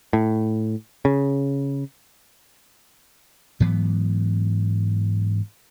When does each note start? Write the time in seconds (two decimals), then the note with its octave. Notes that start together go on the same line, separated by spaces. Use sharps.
0.13 A2
1.05 C#3
3.60 G#2 E3 F#3 B3